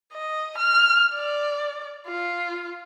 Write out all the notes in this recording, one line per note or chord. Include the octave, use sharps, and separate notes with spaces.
D#5
F6
D5
F4